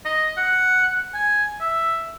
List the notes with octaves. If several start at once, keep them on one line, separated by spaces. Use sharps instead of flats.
D#5
F#5
G#5
E5